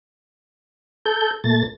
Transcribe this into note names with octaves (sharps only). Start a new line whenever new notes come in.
A4 G6
A#2 A3 A6